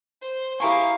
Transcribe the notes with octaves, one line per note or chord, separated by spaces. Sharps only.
C5
E4 G4 G#4 A#4 F5 G#5 C#6